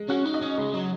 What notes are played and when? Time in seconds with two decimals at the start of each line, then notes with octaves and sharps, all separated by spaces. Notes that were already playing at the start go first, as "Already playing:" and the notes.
Already playing: G#3
0.09 C#4 F#4
0.26 D#4
0.34 D#5
0.42 C#4
0.58 C#3 G#3
0.74 F#3